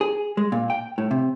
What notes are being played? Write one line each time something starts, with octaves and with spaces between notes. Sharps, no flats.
G#4
G#3
A#2
G5
A2
C3